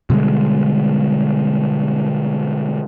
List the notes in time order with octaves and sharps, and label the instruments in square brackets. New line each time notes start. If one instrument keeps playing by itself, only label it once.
[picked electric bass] B2 D3 G3 G#3